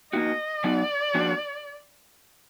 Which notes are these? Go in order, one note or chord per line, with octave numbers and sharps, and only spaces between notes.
A#3 D#4 F#4 D#5
F#3 B3 D#4 F#4 D5
F3 A#3 D4 F#4